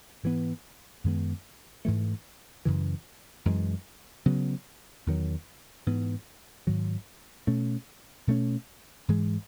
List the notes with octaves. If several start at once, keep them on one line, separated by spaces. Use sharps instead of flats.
G#2 E3 B3
F#2 D#3 G#3 B3
G#2 E3 A3
F#2 C#3 E3
F#2 E3 G#3
C#3 F#3 B3
E2 D#3 F#3
G#2 E3 B3
G#2 D#3 F#3
B2 A3 C#4
B2 A3 C#4
G#2 E3 G#3